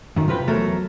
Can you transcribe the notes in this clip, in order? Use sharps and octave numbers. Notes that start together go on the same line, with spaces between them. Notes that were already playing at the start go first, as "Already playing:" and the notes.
F#2 D#3
C3 F4 B4 G5
E2 F#3 A3 A4 A#4